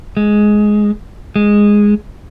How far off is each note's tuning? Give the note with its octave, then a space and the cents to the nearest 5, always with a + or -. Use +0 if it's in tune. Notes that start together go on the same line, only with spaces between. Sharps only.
G#3 +10
G#3 -5